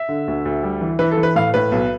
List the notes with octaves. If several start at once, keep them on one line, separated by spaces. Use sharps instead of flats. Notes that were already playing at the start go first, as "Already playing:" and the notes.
Already playing: E5
D3
D2
D2
G3
E3
E3 B4
A4
E3
B4
A2 F5
A2 B4
B1